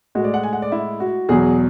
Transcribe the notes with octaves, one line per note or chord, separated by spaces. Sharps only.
A2 G#3 F#4
D5
F#5
G#5
F#5
D5
E4
F#4
E2 B2 F#3 G#4